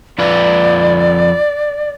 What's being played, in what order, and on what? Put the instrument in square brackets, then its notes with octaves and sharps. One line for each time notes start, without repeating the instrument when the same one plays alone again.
[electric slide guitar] F2 F4 B4 [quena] D5